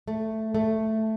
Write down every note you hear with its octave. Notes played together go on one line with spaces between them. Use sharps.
A3
A3